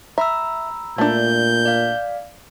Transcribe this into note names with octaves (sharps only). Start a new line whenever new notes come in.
E5 A#5 B5 E6
A#2 A3 D4 G6
D5 F5